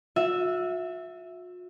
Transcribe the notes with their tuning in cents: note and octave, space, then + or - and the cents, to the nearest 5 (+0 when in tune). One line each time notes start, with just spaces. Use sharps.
F#4 -45 E5 +0